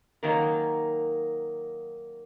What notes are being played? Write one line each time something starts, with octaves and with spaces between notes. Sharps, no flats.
D#3 F#3 A#3 C#4 A#4